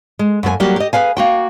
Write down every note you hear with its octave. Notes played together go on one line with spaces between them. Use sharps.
G#3
F#2 A#3 A4 G#5
F#3 G3 A#3 F#4 G4
G4 D#5
G#4 B4 F5 G#5
A#3 F#4 G5